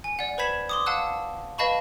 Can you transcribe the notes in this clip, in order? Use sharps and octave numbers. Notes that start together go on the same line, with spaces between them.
G#5
D5 F#5
B4 C5 B5 G#6 B6 E7
C6 D6 D#6
F5 F#5 A5 E6 F#6
B4 D#5 F5 A5 B5 C#6